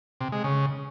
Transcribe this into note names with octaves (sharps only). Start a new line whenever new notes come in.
C3
G#3
C#3